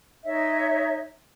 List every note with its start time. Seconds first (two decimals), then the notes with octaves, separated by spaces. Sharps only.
0.24 D#4 C#5 D#5 E5